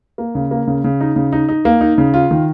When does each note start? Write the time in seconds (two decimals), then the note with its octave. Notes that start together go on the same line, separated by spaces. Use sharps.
0.18 A#3
0.35 C#3
0.51 A#3
0.67 C#3
0.84 C#3
1.01 D#4
1.16 C#3
1.33 D#4
1.49 D#4
1.65 A#3
1.81 D#4
1.98 C#3
2.14 F4
2.31 D#3